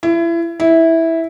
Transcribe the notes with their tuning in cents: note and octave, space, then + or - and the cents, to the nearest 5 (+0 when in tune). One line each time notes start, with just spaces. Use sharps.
E4 +30
E4 -10